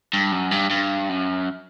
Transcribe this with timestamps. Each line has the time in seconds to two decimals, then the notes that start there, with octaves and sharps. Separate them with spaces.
0.13 G2
0.32 F#2
0.51 G2
0.70 G2
1.09 F#2